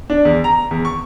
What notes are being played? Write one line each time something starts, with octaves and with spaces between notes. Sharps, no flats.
D4
E2
A#5
E2
C#6